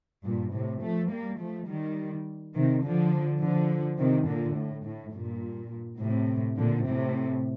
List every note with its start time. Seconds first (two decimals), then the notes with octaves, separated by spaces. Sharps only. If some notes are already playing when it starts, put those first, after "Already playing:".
0.24 G2 A#2
0.52 A2 C3
0.81 F3 A3
1.10 G3 A#3
1.39 F3 A3
1.67 D#3 G3
2.54 C3 D#3
2.83 D3 F3
3.41 D3 F3
3.98 C3 D#3
4.27 A#2 D3
4.56 A2
4.85 A2
5.14 G2 A#2
6.00 A2 C3
6.58 A#2 D3
6.86 A2 C3